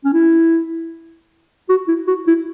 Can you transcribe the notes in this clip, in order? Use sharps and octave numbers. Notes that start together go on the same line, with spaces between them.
C#4
E4
F#4
E4
F#4
E4